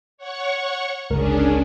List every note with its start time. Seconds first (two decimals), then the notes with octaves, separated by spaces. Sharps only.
0.18 C#5 F#5 C#6
1.10 G1 C#2 C#4 D4 G#4 A#4